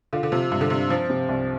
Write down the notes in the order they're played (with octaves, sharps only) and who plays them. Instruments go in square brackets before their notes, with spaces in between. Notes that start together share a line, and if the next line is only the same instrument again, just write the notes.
[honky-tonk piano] D3 [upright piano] F4
[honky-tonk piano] D3
[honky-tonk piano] C3 [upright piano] F3
[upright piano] G2 [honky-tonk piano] C3
[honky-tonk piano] D3
[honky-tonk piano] C3 [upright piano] D4
[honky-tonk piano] F3 [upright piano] C4
[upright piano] C3
C2